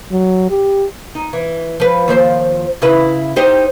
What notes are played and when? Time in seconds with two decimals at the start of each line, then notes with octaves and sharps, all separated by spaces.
0.12 F#3
0.50 G4
1.15 D#4
1.33 E3
1.80 F3 B4
2.08 D#2 F3 C5
2.82 C#3 E4 B4
3.36 D#4 G4 C5